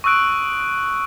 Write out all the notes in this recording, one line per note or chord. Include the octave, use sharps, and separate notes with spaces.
C#6 D#6 E6 F#6 D7